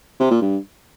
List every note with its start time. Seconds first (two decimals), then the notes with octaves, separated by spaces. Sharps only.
0.20 C3
0.31 A#2
0.42 G2